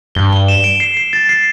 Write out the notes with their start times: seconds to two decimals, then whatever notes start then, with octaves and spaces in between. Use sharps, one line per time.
0.15 G2 G7
0.33 G7
0.48 E7
0.64 D7
0.80 C7
0.97 C7
1.13 A6
1.29 C7